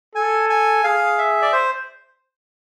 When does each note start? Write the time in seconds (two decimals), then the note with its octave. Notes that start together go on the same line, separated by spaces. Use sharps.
0.15 A4 G#5
0.50 G#5
0.84 G#4 F5
1.18 E5
1.42 D5
1.53 C5